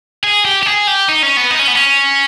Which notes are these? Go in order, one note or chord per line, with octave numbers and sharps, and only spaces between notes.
G#4
G4
G4
G#4
G4
D#4
C#4
B3
D#4
C#4
B3
C#4